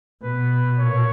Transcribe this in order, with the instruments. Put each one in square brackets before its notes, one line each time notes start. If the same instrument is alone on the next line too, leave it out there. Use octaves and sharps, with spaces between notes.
[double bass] B2 [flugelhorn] B4
[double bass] A#2 [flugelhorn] C#5